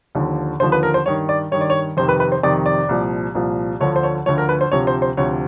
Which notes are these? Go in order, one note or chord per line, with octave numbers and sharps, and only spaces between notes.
D#2 D3 F3
D#2 D3 F3 C5
B4
A#4
C5
G2 D#3 C#5
D5
G2 D#3 C#5
D5
C#5
F2 C3 D#3 C5
B4
B4
C5
F2 C3 D#3 D5
D5
C2 A#2 F3
C2 A#2 F3
D2 D3 F3 C#5
C5
C#5
D2 D3 F3 C#5
A#4
B4
C5
D2 C3 F3 C#5
C5
C5
D2 C3 F3 C#5